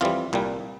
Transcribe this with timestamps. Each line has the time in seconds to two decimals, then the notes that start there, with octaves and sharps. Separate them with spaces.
0.01 F2 E3 G3 F4
0.33 C2 A#2 G3